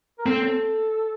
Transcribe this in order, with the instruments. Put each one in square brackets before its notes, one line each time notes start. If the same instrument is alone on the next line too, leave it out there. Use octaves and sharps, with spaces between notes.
[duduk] A#4
[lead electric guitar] C4 [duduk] A4